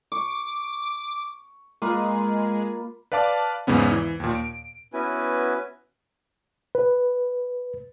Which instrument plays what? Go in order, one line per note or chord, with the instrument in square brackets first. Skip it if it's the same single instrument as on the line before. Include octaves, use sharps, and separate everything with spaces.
[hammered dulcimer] C#6 [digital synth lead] D6
[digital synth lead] G#3 [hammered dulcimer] A#3 F4 B4
[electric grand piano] B4 D5 F5 A5 D6
E2 G#2 C#3 B3 C#4
E3
D#2 A#2
D7
[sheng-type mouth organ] B3 C#4 E4 F#4 B4 G#5
[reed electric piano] B4